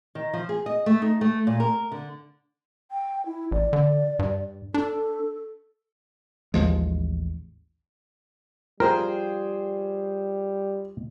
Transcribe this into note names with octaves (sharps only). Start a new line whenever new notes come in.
D#3
F3
G#4
D#5
A3
D#4
A3
A#2
A#4
D3
G5
E4
A1 D5
D3
G2
D4 A4
A1 D#2 F3 G#3
G3 F4 G#4 A#4 C5 G5